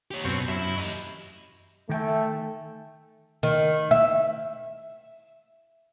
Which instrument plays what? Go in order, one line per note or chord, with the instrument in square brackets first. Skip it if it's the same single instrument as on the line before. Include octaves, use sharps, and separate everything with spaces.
[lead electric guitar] G4 C#5
[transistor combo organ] F#2 C4 C#6 [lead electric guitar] B2
[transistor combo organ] F#2 [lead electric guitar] E5 B5
[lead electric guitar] G4 D#5
[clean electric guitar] D#3 G5 G#5 [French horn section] A3
[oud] D#3
E5